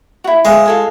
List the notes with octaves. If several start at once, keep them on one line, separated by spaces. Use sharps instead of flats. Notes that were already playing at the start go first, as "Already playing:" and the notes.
E4 F#4
G#3 C5 E5 F5
F4 A4 G#5